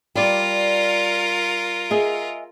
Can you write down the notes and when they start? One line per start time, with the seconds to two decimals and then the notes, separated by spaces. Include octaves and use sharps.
0.15 G3 F4 A#4 D5
1.90 G#4 D#5 E5